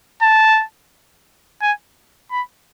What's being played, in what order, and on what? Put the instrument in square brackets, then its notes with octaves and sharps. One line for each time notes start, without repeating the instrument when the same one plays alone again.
[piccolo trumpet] A5
G#5
B5